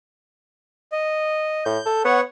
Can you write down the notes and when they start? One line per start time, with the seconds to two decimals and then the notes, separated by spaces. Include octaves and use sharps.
0.92 D#5
1.65 A2 G6
1.85 A4
2.05 B3 C#5 F#5